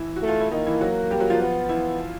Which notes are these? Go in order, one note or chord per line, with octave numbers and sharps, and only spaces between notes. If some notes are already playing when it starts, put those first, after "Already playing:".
Already playing: E3 E4
F#4
A3
F4
E4
D#3 A#3 D#4
E3 E4
F#3 F#4
G3 G4
F#3 F#4
F3 F4
B3
E3 E4